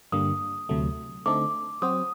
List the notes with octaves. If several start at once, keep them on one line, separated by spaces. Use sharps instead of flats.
G2 D3 G3 A#3 D#6
D2 C3 F#3 A3
D3 A3 C4 D#4 A4 D6
F#3 C4 F#4 C5 D#6